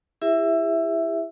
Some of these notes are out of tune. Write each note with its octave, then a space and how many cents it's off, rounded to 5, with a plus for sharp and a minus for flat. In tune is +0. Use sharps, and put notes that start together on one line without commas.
E4 +15 G4 +45 E5 +0